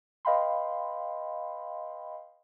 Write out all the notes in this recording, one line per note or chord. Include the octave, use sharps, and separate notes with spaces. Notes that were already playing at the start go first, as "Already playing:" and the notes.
B4 D#5 F5 G5 B5 C6